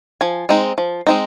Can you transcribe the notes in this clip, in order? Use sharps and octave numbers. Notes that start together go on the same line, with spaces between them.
F3 G#5
G#3 C4 D#4
F3
G#3 C4 D#4